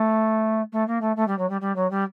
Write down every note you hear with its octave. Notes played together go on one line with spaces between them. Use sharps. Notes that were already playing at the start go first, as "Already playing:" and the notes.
Already playing: A3
A3
A#3
A3
A3
G3
F#3
G3
G3
F#3
G3